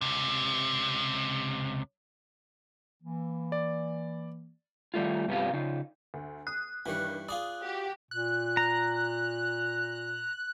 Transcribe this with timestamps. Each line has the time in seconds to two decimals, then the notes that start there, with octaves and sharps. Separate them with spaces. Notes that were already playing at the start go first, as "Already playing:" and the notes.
0.01 C#2 C3
3.03 E3 A#3
3.52 D5
4.94 D#3 G3 A3 F4
5.28 G2 C3 B3 F4 G4 F5
5.53 C#3 D#4 F4
6.14 D2
6.47 D#6 F#6
6.86 G2 D#3 E3 G3 C#5
7.29 F4 G#4 D5 D#6
7.61 F#4 G4
8.11 A#2 F#6
8.57 A#5